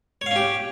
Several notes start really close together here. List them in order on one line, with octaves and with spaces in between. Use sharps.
C#5 F5 C#4 G4